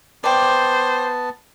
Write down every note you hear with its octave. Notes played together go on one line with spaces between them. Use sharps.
B3 C5 D5 G5 A5